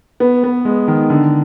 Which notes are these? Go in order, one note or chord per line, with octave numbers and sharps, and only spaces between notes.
B3
B3
G#3
D#3
D3